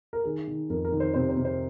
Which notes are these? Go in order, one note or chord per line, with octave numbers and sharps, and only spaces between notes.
A#4
D#3 G#4
D#3
F2 A#4
A#4
D#3
C5
C3 C5
C5
C3
C5